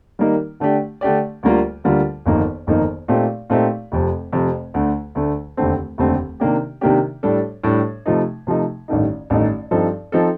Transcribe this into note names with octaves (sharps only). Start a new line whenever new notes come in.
D#3 G3 A#3 D#4 A#4
D3 A3 D4 G4 D5
D3 A3 D4 G4 D5
D2 D3 G3 A#3 F4
D2 D3 G3 A#3 F4
G1 F2 D#3 A#3 D#4
G1 F2 D#3 A#3 D#4
A#2 A3 C4 D#4 G4
A#2 A3 C4 D#4 G4
F1 F2 C3
F1 F2 C3
D2 D3 A3
D2 D3 A3
F1 D#2 D3 A3 C4
F1 D#2 D3 A3 C4
C3 D#3 A#3 D4 G4
C3 D#3 A#3 D4 G4
A2 G3 D4 A4
A2 G3 D4 A4
C3 F3 A3 D#4
C3 F3 A3 D#4
A1 G2 D#3 A3 D#4
A1 G2 D#3 A3 D#4
G2 F3 C4 D#4 A4
F3 C4 D#4 A4